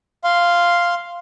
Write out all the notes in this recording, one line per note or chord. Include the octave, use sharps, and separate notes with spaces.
F5 C6